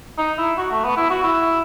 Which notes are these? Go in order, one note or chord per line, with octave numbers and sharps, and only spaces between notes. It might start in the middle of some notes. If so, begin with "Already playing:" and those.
D#4
E4
F#4
A3
B3
E4
F#4
E4